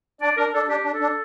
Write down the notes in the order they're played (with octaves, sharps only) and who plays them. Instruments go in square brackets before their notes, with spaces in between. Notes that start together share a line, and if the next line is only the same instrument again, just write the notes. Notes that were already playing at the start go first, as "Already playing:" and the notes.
[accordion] D4 [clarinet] D5
[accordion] D4 [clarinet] A#4
[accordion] D4 [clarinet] A4
[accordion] D4 [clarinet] G4
[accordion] D4
[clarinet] A4
[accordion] D4